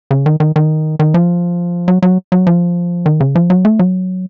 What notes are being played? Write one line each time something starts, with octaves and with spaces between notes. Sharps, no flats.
C#3
D#3
D#3
D#3
D#3
F3
F#3
F#3
F#3
F3
D#3
C#3
F3
F#3
A3
F#3